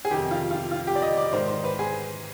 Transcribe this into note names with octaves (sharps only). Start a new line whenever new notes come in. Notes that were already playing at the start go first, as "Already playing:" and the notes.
G#4
F2 C3 D#3 G4
F4
F4
F4
G4
D5
D#5
D5
G#2 D#3 C5
C5
B4
G#4